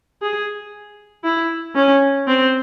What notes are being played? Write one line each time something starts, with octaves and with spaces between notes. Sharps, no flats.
G#4
E4
C#4
C4